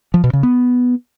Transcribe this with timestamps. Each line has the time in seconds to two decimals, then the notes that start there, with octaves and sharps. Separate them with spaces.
0.14 F3
0.24 B2
0.33 C#3
0.43 B3